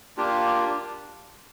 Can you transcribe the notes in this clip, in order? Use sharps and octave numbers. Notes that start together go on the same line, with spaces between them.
A#3 D4 F4 G4